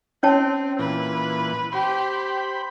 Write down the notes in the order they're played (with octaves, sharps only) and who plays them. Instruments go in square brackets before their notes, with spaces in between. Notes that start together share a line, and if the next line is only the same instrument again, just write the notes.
[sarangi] C4 [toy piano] C#4 C#5 A5
[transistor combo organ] A#2 E3 [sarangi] B4
[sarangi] G4 [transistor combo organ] C5 B5